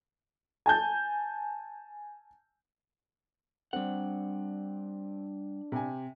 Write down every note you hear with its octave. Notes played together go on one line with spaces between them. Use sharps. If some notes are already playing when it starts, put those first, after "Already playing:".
G#5 A5 G6
G3 C4 D4 F#5
C3 G#5